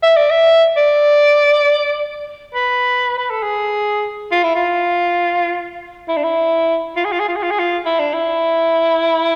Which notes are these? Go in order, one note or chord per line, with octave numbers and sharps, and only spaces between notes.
E5
D5
E5
D5
B4
B4
A4
G#4
F4
E4
F4
E4
D4
E4
F4
G#4
F4
G#4
F4
G#4
F4
G#4
F4
E4
D4
E4